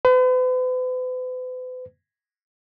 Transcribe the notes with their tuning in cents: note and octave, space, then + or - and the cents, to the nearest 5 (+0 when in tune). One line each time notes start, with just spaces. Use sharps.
B4 +45